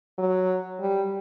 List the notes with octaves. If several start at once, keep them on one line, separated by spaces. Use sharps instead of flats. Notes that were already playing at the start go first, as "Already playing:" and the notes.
F#3
G3